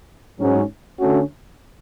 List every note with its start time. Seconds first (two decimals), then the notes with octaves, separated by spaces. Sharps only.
0.39 G#2 F#3 C#4
0.99 D3 A3 C#4 F#4